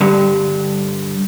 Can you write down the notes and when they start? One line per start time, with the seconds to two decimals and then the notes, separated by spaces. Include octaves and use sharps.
0.01 G2 D3